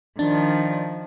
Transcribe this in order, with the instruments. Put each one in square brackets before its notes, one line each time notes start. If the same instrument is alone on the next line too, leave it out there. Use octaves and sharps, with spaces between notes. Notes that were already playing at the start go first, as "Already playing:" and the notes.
[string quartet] D#3 F3 [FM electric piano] D4